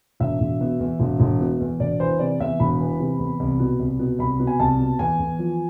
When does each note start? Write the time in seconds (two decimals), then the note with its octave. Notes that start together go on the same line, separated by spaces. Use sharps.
0.20 E1 E5
0.40 E1
0.61 B2
0.80 E2
1.00 E1
1.20 E1
1.41 B2
1.60 E2
1.80 E1 D5
2.00 E3 C5
2.19 C3 D5
2.40 E2 E5
2.60 E1 B5
2.80 E3
3.00 C3
3.19 E2
3.40 C2
3.59 B2
3.80 C2
3.99 B2
4.19 C2 B5
4.40 B2
4.47 G#5
4.60 C2 A5
4.79 B2
4.99 E2 G#5
5.19 E2
5.39 F3